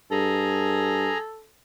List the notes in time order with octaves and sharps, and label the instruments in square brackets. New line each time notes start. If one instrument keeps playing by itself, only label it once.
[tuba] G2 [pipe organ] G#4 A#5 [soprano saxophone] A4